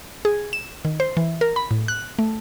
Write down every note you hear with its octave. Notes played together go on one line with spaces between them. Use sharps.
G#4
E7
D#3
C5
E3
A#4
B5
A2
F#6
A3